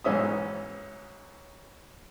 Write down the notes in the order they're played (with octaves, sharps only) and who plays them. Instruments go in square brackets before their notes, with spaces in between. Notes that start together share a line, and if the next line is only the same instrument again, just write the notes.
[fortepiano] B1 G#2 E3 C#4 E5 D#6